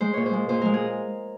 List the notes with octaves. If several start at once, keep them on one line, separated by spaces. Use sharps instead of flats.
G#3 C5
A#2 C#5
C5
G#3
A#2 C5
G#3 A#4
G#4